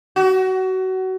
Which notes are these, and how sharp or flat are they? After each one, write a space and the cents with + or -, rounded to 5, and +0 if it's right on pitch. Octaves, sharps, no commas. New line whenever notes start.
F#4 +25